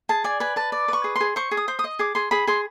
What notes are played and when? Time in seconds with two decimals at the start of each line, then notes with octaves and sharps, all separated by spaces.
0.09 G#4 A5
0.24 D5 G#5
0.40 B4 G#5
0.56 B4 A5
0.72 D5
0.88 B4 C#6
1.04 G#4
1.16 G#4 C6
1.36 C5 C#6
1.51 G#4
1.57 D#6
1.68 C5
1.79 D#6
1.84 D#5
1.99 G#4 D6
2.15 G#4 C6
2.31 G#4 B5
2.47 G#4 C6